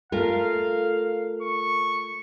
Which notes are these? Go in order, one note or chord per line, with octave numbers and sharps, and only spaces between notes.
A3 F4 A#4 F5
C#6